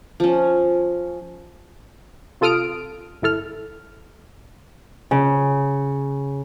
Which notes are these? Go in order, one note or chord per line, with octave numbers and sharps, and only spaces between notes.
F3 C#4
C3 F4 A4 D#6 F6 D7
G1 E4 A4 F6
C#3